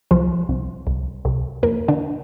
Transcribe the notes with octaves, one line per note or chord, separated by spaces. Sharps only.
C2 F3 F4
C2
C2
C2
F2 A#3 A#4
D3 D4